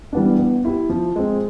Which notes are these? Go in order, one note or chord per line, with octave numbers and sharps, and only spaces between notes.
E3 G3 B3 D4
B3
E4 G4
F3
G#3 C4